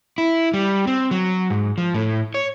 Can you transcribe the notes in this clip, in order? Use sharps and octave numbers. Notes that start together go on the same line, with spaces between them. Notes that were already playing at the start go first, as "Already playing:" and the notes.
E4
G3
C4
F#3
G#2
F3
A2
C#5